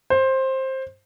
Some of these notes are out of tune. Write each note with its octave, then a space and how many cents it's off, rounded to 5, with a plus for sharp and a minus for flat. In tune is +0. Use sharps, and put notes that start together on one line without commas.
C5 +15